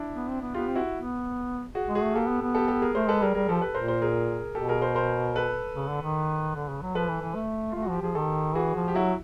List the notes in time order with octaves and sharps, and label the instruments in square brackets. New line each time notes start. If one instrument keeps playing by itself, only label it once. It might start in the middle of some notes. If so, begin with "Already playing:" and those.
Already playing: [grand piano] D4 E4
[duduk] B3
C4
B3
[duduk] B3 [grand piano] F4 G4
[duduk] C4
[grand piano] E4 F#4
[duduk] B3
[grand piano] F#4 G#4
[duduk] G#3
[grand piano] F#4 G#4
[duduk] A3
[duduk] A#3 [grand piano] G4 A4
[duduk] B3
B3
[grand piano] G4 A4
G4 A4
G#4 A#4
[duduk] A3 [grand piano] A#4 C5
[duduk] G#3 [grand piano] A4 B4
[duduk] G3 [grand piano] G#4 A#4
[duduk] G3 [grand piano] G#4 A#4
[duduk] F3 [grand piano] G4 A4
[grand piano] A4 B4
[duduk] A#2 [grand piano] A#4 C5
[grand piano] A#4 C5
G#4 A#4
[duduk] B2 [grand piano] G4 A4
[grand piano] G#4 A#4
A#4 C5
A#4 C5
A4 B4
[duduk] C#3
D3
D#3
D3
C#3
F#3
[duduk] F3 [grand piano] A4 B4
[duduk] E3
E3
A3
[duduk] A3 [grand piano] F4
[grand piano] F#4
[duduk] F3
[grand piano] G4
[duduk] F3 [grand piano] G#4
[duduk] D#3 [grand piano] G4 A4
[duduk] E3 [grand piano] F#4 G#4
[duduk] F3
[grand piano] G4
[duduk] F#3 [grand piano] E4 F#4